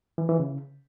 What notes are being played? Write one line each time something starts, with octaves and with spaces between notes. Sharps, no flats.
E3
E3
C#3